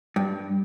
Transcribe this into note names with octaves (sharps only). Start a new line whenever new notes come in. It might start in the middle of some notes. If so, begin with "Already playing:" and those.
G2